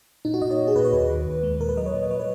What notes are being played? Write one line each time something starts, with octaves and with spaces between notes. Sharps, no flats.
A#2 D#4
F#4
A#2 D#5
C#5
A#2
G#4
A#2 B4
C#5
D#2 B4
D#3
D#2
G#3
A#2 A#4
B4
F#3 D#5
C#5
A#2
D#5
F#3 C#5
B4